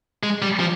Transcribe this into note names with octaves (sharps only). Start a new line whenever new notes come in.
G#3
G3
F3